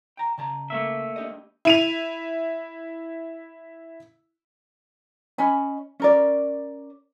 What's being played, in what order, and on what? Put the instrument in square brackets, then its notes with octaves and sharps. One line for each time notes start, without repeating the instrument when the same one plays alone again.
[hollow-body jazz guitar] G5 A#5
C#3 A5 A#5
[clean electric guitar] A3 A#3 E5
[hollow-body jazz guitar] D4 G4 D#5
[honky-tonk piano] E4 D#7 F7
[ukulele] C#4 D#5 G#5 B5
C#4 A#4 D5